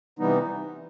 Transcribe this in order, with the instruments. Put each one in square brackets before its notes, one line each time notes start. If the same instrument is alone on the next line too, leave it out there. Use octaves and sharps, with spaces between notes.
[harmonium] C3 E3 G3 B3 D#4